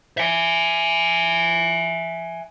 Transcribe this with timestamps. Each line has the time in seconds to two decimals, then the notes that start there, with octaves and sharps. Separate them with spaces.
0.18 E5 G#5